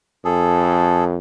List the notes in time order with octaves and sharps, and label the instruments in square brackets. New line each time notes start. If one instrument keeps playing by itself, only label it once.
[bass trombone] F2 [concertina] G#4 A4